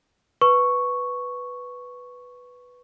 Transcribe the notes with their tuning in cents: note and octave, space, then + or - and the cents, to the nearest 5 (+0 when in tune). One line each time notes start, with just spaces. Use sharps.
B4 +0 C#6 +0